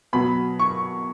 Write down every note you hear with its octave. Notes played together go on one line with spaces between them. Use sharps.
B2 F#3 B5
C#6